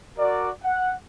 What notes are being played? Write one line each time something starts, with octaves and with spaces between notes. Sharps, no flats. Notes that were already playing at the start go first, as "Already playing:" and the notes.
F#4 A#4 D5
F#5